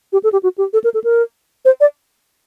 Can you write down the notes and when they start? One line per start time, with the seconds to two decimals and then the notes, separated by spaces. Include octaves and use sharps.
0.12 G4
0.23 A4
0.32 G4
0.43 F#4
0.58 G4
0.73 A4
0.84 A#4
0.94 A4
1.04 A#4
1.65 C5
1.80 D5